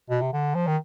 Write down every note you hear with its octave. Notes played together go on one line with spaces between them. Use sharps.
B2
C3
D3
F3
D#3